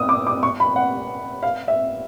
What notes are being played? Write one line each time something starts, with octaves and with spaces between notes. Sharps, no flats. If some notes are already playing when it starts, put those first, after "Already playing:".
Already playing: D#6 E6
D6
D6
C#6
B5
F#5
F5
E5